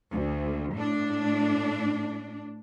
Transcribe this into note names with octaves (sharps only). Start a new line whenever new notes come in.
D2
A2 D4